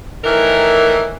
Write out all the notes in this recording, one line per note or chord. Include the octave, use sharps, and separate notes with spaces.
A2 D#3 E3 A#4